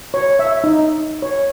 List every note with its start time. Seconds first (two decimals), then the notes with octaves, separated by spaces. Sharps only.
0.14 C#5
0.39 E5
0.64 D#4
1.22 C#5